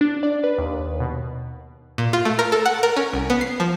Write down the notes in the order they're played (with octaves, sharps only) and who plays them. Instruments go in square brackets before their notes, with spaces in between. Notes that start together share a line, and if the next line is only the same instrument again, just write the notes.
[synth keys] D4
D5
B4
D#2
B2
[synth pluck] A#2
F4
A3
A#4
A4
F#5
A#4
C#4
C2
B3
C7
F3